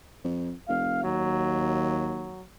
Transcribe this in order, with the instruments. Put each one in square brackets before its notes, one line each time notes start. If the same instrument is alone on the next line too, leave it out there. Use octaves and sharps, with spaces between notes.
[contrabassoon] F2
[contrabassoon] F1 [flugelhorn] F5
[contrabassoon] D#2 [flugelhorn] F#3